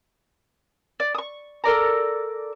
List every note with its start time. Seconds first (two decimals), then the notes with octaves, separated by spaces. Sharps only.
1.00 D5
1.15 C#6 D#6
1.64 A4 A#4 D5 A#5